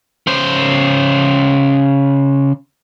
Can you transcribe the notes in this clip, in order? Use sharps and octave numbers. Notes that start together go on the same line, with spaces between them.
C#3 C5